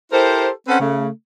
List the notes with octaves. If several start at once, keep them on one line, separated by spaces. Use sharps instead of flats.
E4 G4 A4 A#4 C5
C4 C#4 A4 B4 C5 F#5
C#3 A3